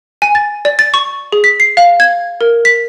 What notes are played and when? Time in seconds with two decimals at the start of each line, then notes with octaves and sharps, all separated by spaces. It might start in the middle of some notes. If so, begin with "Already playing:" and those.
0.22 G#5
0.35 A6
0.65 D5
0.79 A6
0.94 C#6
1.32 G#4
1.44 B6
1.60 C7
1.77 F5
2.00 G#6
2.41 A#4
2.65 B6